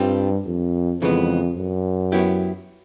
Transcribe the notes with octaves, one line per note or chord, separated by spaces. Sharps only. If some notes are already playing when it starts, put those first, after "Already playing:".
Already playing: G2 G3 C4 F4
F2
F2 C#3 E3 G#3 B3
F#2
F#3 B3 E4 G4